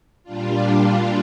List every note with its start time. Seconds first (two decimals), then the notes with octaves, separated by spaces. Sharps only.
0.23 A#2 G3 D4 F4